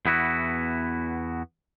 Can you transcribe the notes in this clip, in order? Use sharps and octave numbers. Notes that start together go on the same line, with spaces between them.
E2 B3 E4 F#4